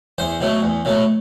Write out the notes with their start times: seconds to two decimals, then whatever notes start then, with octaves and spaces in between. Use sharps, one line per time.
0.18 E2 C5
0.41 B2 F#3 A3
0.62 E2
0.85 B2 F#3 A3